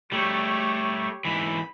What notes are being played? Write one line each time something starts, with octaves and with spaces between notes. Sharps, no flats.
G3 A3 G4 C#5
G#2 E3 B5